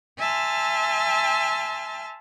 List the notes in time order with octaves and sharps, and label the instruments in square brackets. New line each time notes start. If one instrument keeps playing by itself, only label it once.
[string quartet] E5 G#5 A5 C6 F6